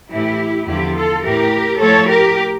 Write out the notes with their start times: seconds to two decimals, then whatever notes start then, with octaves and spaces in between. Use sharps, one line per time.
0.11 A2 E3 E4 G4
0.67 E2 D3 F3 E4 G4
0.95 F4 A4
1.23 A2 E3 G4 A#4
1.79 A2 F3 A4 C#5
2.08 G4 A#4